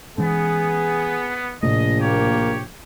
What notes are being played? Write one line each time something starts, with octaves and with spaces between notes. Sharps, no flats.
E3 G#3 B3 C#4 G#4
A#1 A2 C3 A3 D#5
A#3 G4 C#5